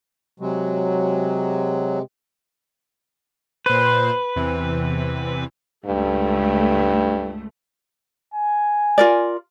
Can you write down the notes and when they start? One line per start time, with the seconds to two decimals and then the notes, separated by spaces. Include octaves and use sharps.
0.40 C3 F#3 G#3
3.66 A#2 B4 C5
4.36 E2 C3 E3
5.86 C#2 G2 A3
8.34 G#5
8.98 F4 A#4 D5